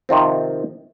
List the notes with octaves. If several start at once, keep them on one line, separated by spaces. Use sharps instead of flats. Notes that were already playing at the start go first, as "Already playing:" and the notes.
C3 D#3 F3 C4